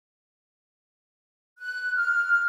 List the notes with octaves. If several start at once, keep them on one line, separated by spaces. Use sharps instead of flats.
F#6
F6